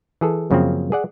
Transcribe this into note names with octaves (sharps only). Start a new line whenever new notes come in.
E3 G#4 A4
F#2 C#3 F3 A#3 C4
G#4 D5 F#5